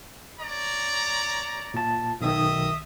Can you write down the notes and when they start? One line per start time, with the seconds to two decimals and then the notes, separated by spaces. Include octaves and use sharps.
0.40 C#5 D5 A#5
1.74 A#2 A5
2.21 B1 D#3 D#5 E5 D#6